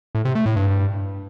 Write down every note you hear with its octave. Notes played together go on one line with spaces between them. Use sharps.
A2
C3
A3
A2
G2